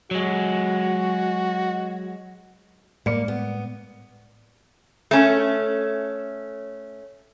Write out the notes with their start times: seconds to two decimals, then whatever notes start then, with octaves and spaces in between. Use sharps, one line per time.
0.11 F#3 G#3 F#4
3.06 A2 G3 G#3 A#3 D5 C#7
3.28 B3
5.11 A3 C#4